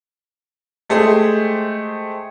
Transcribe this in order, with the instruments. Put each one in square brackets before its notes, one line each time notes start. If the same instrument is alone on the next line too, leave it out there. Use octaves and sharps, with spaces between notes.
[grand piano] G#3 A3 G4 G#4 C5